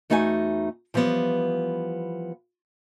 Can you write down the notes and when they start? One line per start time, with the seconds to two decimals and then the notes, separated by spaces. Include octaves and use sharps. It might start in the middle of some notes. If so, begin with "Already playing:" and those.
0.10 E2 A3 D#4 F#4 E5 G#5
0.94 E3 F3 G3 B3